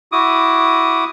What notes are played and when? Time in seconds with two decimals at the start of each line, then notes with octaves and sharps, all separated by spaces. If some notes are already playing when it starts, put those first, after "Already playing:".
0.12 E4 F#4 D6 D#6